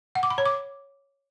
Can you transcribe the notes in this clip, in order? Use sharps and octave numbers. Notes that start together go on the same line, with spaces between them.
F#5
D6
B5
C#5
D6